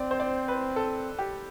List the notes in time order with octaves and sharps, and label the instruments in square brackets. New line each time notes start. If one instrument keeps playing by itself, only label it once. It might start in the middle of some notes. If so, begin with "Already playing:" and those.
Already playing: [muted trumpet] C4 [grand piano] D5
[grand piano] C5
D5
B4
A4
G4